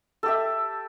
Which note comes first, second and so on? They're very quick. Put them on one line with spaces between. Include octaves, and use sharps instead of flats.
A4 G4 E5